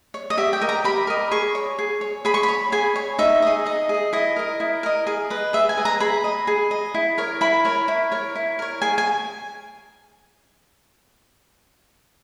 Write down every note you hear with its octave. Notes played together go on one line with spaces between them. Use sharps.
C#5
D#5
G4 E5
G5
A#4 D#5
A#5
G4 B5
A#4 D#5
G#4 C#6
C#5
G#4
C#5
G#4 B5
C#6
B5
C#5
G#4 G#5
C#5
D#4 E5
G#4 D#5
D#4 D#5
G#4 D#5
E4 D#5
A#4 D#5
E4
A#4 D#5
G#4
B4 D#5
G#4 E5
G#5
B4 D#5
A#5
G#4 B5
D#5
G#4
D#5
E4
A#4 C#5
E4 B5
A#4 C#5
E4
A#4 C#5
E4
A#4 C#5
G#4 G#5
G#5